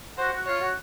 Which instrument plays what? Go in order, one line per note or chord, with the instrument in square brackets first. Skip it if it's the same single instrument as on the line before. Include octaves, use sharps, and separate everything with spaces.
[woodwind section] F#4 [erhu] C5
[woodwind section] F#4
[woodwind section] F4 [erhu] C#5
[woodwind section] F#4